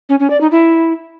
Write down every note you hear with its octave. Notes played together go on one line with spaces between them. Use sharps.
C#4
C#4
D5
D#4
E4